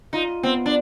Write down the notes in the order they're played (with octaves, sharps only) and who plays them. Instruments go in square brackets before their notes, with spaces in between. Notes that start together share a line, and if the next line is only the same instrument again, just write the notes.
[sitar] D#4 [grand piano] F4
[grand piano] B3 [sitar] C4
[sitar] D4